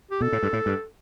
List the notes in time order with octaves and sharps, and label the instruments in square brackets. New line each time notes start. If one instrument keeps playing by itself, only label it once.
[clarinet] G4
[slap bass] B2 [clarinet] A4
[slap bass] A2
G2
A2
G2